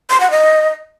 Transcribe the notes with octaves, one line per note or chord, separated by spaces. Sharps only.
C6
F#5
D#5